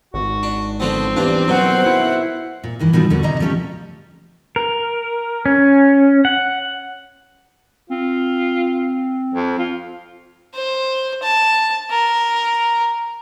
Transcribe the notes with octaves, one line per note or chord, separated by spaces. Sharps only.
G#1 F#4
D4
D3 F3 B3 C4
E2 G2 D4 F4
F#2 B2 F#3 C5 F#5
E4
A#2
G2 D#3 E3
G#2 B2 D#3 F3 G3 C4
D#2 D3 F#4
D2 A2 C3 D#5 A#5
C3 F3 A3 C#4 G4
A#4
C#4
F#5
C4 F4
F2
F4
C5
A5
A#4